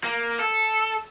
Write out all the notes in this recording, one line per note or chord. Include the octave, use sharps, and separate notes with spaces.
A#3
A4